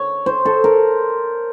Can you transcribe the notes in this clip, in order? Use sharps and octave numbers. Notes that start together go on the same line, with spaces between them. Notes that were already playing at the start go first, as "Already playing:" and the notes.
Already playing: C#5
C5
A4
A#4